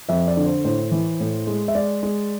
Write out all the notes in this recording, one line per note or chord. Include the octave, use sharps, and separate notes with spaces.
F2 E5
D5
D3
C5
A2 C5
E3
A2
G#3
E5
G#3 D5
G#3